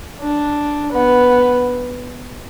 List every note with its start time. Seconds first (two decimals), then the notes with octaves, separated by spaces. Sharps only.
0.20 D4
0.92 B3